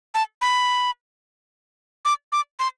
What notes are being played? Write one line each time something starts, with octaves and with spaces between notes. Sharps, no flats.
A5
B5
D6
D6
C6